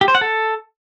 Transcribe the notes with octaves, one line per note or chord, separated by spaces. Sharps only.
G4
C5
F#5
A4